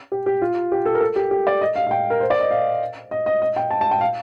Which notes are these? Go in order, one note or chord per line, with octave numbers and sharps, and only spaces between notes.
G4
G4
F4
G4
A4
A#4
A4
G4
G4
D5
D#5
F5
F5
G5
A#4
C5
D5
D#5
F5
D#5
D#5
D#5
G5
A5
A5
G5
F5